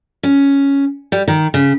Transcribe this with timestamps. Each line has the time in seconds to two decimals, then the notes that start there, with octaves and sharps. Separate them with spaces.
0.23 C#4
1.12 G3
1.28 D#3
1.54 C#3